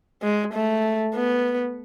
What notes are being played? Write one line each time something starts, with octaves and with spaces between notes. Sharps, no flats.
G#3
A3
B3